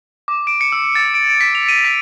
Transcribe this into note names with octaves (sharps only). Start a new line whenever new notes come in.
D6
D7
C#7
E6
A6
D7
D7
B6
F7
D#7
B6